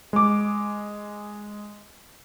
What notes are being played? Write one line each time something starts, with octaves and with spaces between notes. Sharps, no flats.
G#3 D6